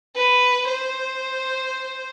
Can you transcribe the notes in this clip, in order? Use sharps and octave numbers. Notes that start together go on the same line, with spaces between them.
B4
C5